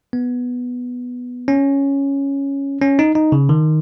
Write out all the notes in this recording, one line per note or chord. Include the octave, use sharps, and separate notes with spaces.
B3
C#4
C#4
D#4
D#4
C#3
D#3